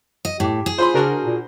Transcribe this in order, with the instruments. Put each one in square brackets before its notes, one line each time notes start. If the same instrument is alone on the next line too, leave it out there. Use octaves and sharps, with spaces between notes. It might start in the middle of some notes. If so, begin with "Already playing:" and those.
[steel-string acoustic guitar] D#5
[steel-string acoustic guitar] A2 [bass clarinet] G4
[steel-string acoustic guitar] G#4
[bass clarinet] F4 [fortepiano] C5 B5 C6
[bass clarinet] C#3 [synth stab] D4 F#4 A#4
[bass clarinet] A#2